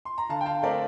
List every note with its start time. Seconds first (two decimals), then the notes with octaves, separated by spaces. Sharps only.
0.05 C6
0.18 A#5
0.29 D3 F5 A5
0.41 G5
0.46 F5 A5
0.63 A3 C4 A#4 D5